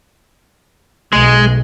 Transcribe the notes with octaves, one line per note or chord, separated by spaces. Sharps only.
B1 G#3